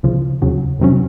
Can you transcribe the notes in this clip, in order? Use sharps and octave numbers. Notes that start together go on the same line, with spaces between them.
C#2 C#3 F3
D#2 C#3 F#3
F2 C3 F#3 C#4